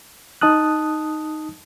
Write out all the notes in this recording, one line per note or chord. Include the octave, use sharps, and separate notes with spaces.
D#4 A5 D#6 F#6